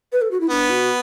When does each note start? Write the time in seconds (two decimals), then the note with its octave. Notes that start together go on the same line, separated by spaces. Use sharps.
0.13 B4
0.22 A4
0.31 F#4
0.40 E4
0.49 B3 D4
0.70 F#4